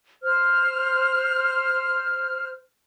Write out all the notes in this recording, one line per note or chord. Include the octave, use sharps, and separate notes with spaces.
C5 F6